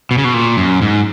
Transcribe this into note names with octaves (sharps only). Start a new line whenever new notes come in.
B2
C#3
B2
A#2
F#2
G#2